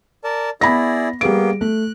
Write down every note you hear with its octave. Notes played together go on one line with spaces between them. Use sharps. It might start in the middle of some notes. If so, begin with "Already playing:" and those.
A#4 D5 A5
B3 E4 G#4 D5 B5 A#6
G3 A#3 B3 G#4 D7
A3 F#6